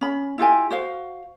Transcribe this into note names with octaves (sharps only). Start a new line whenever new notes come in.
C#4 B5
E4 F4 G4 G#5
F#4 C5 F5